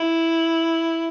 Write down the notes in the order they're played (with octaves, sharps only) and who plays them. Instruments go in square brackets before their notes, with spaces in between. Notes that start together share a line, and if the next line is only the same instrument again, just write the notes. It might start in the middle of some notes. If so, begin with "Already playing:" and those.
Already playing: [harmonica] E4